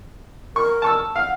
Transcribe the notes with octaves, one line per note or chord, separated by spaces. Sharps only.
A#4 C#6
A5 C#6 E6
F5 F#5